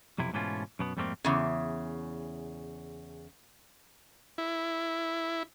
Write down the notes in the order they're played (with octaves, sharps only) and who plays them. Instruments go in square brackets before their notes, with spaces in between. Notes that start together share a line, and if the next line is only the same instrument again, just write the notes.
[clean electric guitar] B1 F2 C3 E4
G#2 B2 E3 A3 C#4 F4
F#2 B2 B3
F2 G#2 G3 A3 A#3 C4
[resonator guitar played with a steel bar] E2 C#3
[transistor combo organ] E4